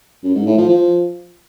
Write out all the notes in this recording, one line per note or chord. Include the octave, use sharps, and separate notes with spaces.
F#2
G#2
A2
F3
F3